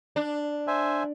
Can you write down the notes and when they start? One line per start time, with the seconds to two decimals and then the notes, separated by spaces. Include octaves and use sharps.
0.16 D4
0.67 C5 E5 G#5